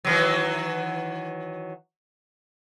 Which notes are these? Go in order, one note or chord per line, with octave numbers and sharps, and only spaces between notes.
D#3 E3 F#3